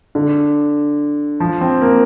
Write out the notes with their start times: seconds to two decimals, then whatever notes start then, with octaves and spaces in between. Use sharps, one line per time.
0.15 D3
1.40 F3
1.61 C4
1.82 A#3